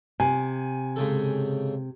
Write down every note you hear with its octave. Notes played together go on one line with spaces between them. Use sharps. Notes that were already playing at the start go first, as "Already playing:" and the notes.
C3 G#5
G#2 C#3 A4